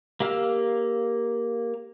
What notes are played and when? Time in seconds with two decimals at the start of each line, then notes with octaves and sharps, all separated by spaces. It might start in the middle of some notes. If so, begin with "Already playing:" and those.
0.20 A#3 G4 F5 E6 F6